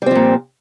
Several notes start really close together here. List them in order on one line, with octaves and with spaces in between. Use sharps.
G3 C4 F3 A#2